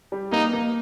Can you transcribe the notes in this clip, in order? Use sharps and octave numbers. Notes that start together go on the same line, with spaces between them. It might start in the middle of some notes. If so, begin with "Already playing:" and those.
G3
A#3 D#4
A#3